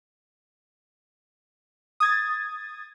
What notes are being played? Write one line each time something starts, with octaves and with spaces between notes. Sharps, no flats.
D#6 G#6 A6